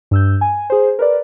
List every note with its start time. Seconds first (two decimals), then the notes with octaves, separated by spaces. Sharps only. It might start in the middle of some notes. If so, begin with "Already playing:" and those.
0.11 G2 E6 G6
0.41 G#5
0.70 G#4 C5
0.99 A#4 B4 D5